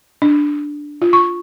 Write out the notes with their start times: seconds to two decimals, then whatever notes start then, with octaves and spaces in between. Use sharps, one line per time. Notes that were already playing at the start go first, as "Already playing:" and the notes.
0.22 D4
1.02 F4
1.13 C#6